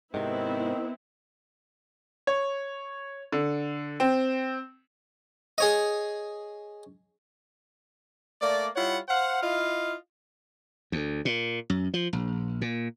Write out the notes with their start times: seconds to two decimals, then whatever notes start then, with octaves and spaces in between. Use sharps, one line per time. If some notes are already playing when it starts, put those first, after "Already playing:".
0.14 G#2 C3 D#3 B3 C4 E4
2.27 C#5
3.32 D3
4.00 C4
5.58 G#4 C#5 D#5
8.41 A3 A#3 D5
8.76 G3 E4 F4 C#5 F#5
9.08 C5 F5 F#5
9.42 E4 F4 D#5 F5
10.92 D2
11.25 A#2
11.70 F#2
11.94 F3
12.13 A#1
12.61 A#2